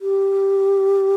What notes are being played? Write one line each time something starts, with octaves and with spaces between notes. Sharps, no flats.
G4